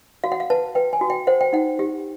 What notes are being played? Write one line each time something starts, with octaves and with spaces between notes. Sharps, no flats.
F#4 F5
F#5
F5
B4 A5
B4 G5
G#5
F#4
G5
C5 F#5
G5
D#4 F#5
G4